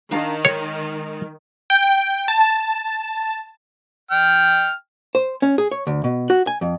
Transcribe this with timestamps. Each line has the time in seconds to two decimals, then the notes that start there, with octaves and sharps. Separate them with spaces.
0.11 D#3 D4 F5 A#5
0.45 G#3 A#4 C#5
1.70 G5
2.28 A5
4.11 G5 F6
5.15 C5
5.42 C#4
5.58 G#4
5.72 C#5
5.87 D2
6.04 B2
6.30 F#4
6.47 G#5
6.61 F2